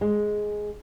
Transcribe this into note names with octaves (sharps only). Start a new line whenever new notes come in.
G#3